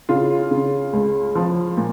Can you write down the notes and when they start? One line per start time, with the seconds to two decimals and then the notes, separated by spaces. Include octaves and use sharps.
0.09 C#3 F4
0.51 C#3
0.93 C#2
1.35 F3
1.77 A#2